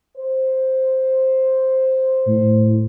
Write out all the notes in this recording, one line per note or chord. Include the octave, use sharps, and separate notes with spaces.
C5
A2